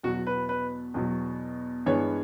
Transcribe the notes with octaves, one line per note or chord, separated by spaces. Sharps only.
E2 B2 F#3 F#4
B4
B4
E2 B2 F#3
G2 E3 G#3 B3 C#5